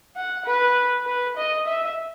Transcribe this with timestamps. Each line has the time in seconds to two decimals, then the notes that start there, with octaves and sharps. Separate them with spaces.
0.17 F#5
0.46 B4
1.06 B4
1.37 D#5
1.67 E5